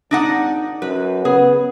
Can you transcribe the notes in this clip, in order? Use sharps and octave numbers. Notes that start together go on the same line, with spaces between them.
G#1 D4 D#4 F#5
F#2 B4
C#3 B3 G#4